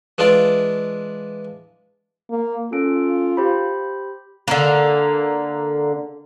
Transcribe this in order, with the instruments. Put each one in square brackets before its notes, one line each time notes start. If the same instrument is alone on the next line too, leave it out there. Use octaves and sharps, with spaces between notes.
[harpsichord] E3 G#3 D4 F4 D5
[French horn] A#3
[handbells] C#4 A4 D7 [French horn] F4
[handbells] G4 C5 B5
[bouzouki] D3 A#3